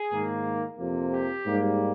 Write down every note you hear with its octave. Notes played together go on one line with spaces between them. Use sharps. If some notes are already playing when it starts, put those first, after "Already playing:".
Already playing: G#4
G#2 D#3 A#3
F2 C3 F3 A#3
G4
G#2 G3 A#3